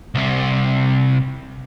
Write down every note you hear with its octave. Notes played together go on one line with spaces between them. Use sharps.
C2 C3